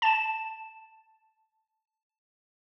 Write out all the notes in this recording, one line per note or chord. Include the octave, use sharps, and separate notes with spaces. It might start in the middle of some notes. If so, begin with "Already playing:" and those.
A5 E7